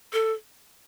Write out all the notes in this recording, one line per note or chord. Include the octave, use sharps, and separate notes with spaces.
A4